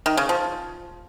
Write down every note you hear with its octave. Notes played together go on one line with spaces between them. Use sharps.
D#3
C#3
F3